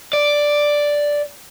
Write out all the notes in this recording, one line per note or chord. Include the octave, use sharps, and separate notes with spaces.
D5